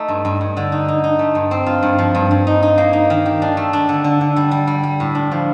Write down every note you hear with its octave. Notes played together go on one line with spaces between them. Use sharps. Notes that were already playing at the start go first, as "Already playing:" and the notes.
Already playing: A3 D#4
G2
G2
G2
D3
D#4
D#4
D#4
A3
G2
C4
F4
G2
F3
G2
G2
D#4
D#4
A#3
D#4
D#3
G4
D4
A3
D4
D3
D3
D3
G3
G3
G3
G3
A2
D4
F3